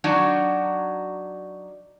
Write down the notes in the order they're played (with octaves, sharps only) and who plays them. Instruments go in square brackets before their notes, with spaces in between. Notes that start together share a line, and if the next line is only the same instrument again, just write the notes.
[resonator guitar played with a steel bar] F#3 D4 D#4 F#4